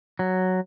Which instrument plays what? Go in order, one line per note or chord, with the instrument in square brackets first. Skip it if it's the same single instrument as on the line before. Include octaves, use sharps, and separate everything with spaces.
[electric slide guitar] F#3